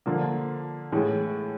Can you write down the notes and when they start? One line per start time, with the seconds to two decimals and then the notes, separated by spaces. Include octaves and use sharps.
0.06 D3 F3 A#3
0.92 A2 E3 G#3